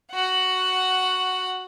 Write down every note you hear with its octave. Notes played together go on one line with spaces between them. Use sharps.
F#4 F#5